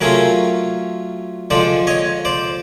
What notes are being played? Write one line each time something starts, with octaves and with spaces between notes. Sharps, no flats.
F#3 A3 C#4 F4 G#4 A#4
D3 F3 G#3 C5 D5
C#5 D#5
C5 D5